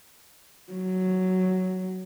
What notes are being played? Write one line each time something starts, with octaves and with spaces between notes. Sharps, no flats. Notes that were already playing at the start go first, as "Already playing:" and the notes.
F#3